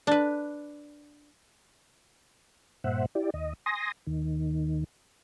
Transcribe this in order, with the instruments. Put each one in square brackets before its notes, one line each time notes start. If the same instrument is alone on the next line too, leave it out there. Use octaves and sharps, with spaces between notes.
[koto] D4 B4
[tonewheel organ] G2 A#2 C5 E5 F#5
E4 G4 D5
D#2 D#5
G#5 C6 D#6 A#6
D#2 D#3